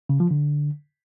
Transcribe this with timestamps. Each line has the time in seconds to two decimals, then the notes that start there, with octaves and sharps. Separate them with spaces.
0.09 C#3
0.20 F3
0.31 D3